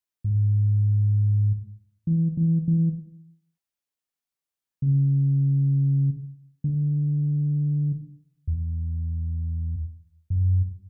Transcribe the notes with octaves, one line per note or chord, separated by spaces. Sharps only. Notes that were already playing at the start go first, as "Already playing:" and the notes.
G#2
E3
E3
E3
C#3
D3
E2
F#2